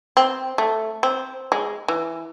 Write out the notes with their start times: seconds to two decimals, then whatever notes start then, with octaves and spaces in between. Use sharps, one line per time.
0.17 C4
0.58 A3
1.03 C4
1.52 G#3
1.88 E3